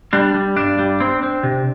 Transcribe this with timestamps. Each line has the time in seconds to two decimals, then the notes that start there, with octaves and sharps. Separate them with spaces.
0.13 G3 D4
0.34 G3
0.56 G2 D4
0.79 G3
1.00 C4
1.23 C4
1.43 C3